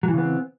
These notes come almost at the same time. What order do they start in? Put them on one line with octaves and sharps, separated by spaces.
F#3 E3 C#3 B3 C4